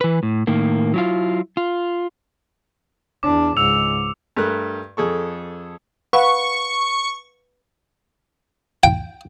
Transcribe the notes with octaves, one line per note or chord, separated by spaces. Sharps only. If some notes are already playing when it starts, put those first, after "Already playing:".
E3 B4
A2
A2 D#3 A#3
F#3 E4 F4
F4
E2 D4 D6
C#2 G#2 E6 C#7 F7
G2 A3 A#4 F#6
F2 G#4 A4 C#6
B4 F5 F#5 C#6
G5